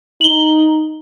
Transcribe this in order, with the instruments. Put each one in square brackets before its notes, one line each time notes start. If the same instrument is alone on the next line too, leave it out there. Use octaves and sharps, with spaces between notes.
[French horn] D#4 [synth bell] F#7 G7